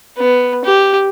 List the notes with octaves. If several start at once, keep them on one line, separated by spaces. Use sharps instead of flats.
B3
G4